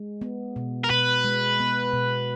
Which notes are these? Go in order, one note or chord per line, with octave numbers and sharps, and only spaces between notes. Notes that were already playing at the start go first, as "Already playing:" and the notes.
Already playing: G#3
B3
B2
A#4
B2 B4
G#3
B3
B2